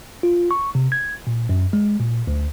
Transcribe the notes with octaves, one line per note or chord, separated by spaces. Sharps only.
F4
C#6
C3
G#6
A#2
F#2
G#3
A#2
D2